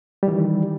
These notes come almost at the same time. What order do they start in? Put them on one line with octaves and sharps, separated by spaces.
G3 E3 D#3